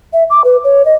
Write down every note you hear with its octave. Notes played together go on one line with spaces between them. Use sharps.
E5
D6
B4
C#5
D#5